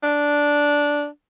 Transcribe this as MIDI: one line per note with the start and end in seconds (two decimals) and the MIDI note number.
0.03 1.06 62